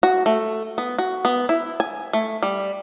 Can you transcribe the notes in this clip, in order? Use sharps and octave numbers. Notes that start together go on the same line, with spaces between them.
F#4
A3
B3
F#4
B3
E4
G#5
A3
G3